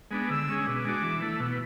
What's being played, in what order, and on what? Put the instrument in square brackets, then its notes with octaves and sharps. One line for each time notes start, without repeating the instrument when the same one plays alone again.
[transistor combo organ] G#3 B3 D4
[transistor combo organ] D3 [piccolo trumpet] E6
[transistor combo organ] G#3 C#4 G#4
[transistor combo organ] B2 [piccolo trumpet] D6
[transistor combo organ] G#3 D4 F#4
E3
A3 E4
B2